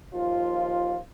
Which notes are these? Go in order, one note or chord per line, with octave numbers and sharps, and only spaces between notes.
D#2 F3 F4